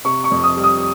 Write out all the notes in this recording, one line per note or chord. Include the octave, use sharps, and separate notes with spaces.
C3 C#6
C#6
F2
D#6
G3
D#6